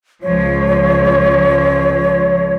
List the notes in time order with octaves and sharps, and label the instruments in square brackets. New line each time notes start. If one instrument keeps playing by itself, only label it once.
[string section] C#2 F3 [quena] C#5